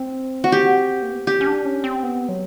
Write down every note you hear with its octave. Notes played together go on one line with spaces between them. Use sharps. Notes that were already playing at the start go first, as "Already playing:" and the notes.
Already playing: C4
F#4
G4
A#3
B3
C4
C#4 G4
C#4
D4
C#4
C4
B3
F#3